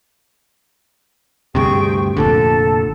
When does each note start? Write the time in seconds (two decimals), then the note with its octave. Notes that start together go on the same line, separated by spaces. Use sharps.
1.55 D2 G2 C3 G#4 G5 C#6
2.17 F1 A#2 D3 A4